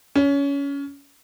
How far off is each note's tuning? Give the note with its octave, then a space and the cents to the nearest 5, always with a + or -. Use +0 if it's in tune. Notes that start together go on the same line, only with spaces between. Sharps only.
C#4 +20